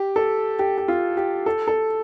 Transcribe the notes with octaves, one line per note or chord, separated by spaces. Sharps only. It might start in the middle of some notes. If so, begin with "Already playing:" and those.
Already playing: G4
A4
G4
G4
F4
G4
A4
A4